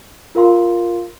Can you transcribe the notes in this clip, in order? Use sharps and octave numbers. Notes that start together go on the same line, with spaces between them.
F4 A#4 F5 C6